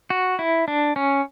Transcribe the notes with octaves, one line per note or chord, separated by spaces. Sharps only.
F#4
E4
D4
C#4